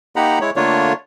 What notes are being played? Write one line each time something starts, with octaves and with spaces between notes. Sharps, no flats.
A#3 D#4 G4 F#5 A#5 B5
G#3 E4 C#5
D3 A3 A#3 D4 F4 C#5